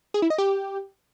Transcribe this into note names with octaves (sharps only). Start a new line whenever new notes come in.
G#4
E4
D#5
G4